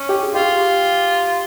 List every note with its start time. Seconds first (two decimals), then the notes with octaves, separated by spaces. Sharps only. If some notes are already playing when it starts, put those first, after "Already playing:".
Already playing: C#4
0.09 G4
0.23 G#4
0.34 F4 G4